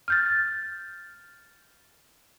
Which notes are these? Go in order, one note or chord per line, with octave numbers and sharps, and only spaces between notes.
F6 G6 A6